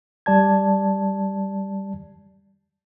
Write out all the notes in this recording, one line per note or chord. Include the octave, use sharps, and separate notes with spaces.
G3 D5 A5 G#6